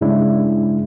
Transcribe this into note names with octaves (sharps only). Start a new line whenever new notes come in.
G2 C#3 G#3 D4 E4